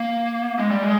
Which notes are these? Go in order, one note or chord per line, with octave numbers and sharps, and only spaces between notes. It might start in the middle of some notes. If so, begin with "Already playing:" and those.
Already playing: A#3
G#3
G3
G#3